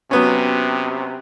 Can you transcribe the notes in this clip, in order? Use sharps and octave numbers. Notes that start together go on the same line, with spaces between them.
C3 F#3 B3 C#4